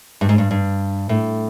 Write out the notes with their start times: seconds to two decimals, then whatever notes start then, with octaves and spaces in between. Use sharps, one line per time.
0.21 G2
0.29 G#2
0.38 G2
0.51 G2
1.09 A2